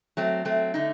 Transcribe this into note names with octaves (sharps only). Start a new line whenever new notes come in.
F#3 A3 C4
F#3 A3 C4
D3 A3 D#4